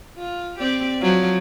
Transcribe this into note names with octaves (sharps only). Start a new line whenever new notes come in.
F4
C4 G4 D5
F3 F#3